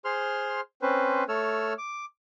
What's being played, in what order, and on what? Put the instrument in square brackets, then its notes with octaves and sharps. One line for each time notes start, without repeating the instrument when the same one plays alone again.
[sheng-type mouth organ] G#4 C5 C6 F6
C4 C#4 B4 C5
A3 A4 C#5 E6 F6
D6